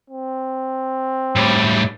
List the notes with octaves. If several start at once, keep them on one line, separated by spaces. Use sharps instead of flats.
C4
A2 G3